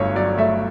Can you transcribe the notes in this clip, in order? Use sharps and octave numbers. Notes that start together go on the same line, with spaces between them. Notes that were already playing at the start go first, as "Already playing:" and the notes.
Already playing: G1 G2 F#3 A3 C#5
F#3 D5
A3 E5